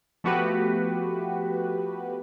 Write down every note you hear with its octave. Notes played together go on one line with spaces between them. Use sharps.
F3 A3 B3 F#4 G4 B4